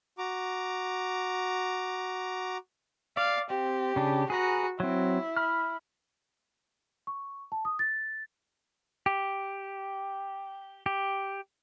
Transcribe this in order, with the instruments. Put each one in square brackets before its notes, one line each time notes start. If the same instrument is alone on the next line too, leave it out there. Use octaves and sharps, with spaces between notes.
[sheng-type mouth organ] F#4 A#5 D6
[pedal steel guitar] D5 [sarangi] F5
[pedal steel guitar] C4 [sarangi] G4
[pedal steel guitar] C#3 D4
[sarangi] F#4 [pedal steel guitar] G#4 B4 A#5
[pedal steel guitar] F#3 C4 [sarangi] E4
[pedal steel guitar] B5 F6
[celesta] C#6
A5
D#6
A6
[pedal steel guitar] G4
G4